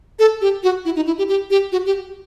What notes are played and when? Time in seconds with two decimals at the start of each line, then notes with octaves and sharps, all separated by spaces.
0.19 A4
0.41 G4
0.63 F#4
0.85 E4
0.96 D#4
1.07 E4
1.18 G4
1.29 G4
1.50 G4
1.72 F#4
1.86 G4